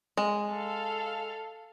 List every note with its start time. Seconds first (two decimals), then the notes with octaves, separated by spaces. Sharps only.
0.17 G#3
0.50 A4 F5